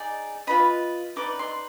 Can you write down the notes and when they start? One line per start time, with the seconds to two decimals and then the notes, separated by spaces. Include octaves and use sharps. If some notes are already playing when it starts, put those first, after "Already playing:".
Already playing: D#4 G#4 D5
0.47 F4 B4 D#5 B5
1.16 D#4 B4 D5 D6
1.39 C6